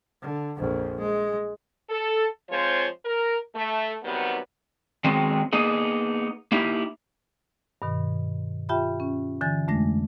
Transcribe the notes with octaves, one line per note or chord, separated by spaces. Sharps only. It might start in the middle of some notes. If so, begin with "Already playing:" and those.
D3
A#1 F2
G#3
A4
F3 G#3 C4 F4 C5 C#5
A#4
A3
C3 D#3 F#3 G3 B3
D#3 F#3 G#3 B3 C4
A#3 B3 D#4 G#4
A#3 D#4 E4 G4
G2 B2 D#3
F4 G4 E5 G5 A5 B5
C#4
D3 E3 G#5 A6
F2 G#3 A3 D4 A#6